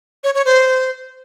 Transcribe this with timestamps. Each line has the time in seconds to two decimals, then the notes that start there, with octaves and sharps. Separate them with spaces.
0.24 C#5
0.35 C#5
0.45 C5